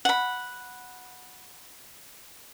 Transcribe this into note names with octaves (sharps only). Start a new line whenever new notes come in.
F#5 B5